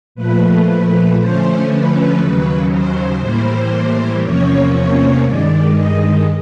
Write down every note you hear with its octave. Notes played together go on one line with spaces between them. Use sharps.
A#2 F3 A3 B4
B4
D3 F3 A3 C#4 C5
B4
D#2 C#3 F#3
C5
A2 E3 G3 A#3 C5
E2 C3 F3 A#3 C#4 C#5
C#5
G2 D#3 G#3 D5
D#5